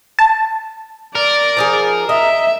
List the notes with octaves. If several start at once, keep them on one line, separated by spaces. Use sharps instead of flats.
A5
A#4 D5
F3 D#4 G#4
D#5 E5